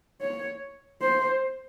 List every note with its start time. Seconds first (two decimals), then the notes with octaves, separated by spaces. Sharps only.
0.21 C#5
1.01 C5